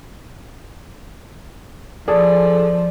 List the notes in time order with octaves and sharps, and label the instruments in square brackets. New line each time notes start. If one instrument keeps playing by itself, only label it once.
[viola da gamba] F3 [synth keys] G#4 A4 [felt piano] D5